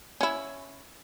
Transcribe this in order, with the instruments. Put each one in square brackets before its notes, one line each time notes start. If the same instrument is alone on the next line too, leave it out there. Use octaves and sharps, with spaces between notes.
[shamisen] C#4 E4